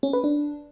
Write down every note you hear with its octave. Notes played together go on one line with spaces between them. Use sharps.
C#4
B4
D4